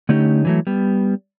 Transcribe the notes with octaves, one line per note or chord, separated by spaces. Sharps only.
D3 A3 C#4 D#4 G4
E3 F#3 A3
G3 B3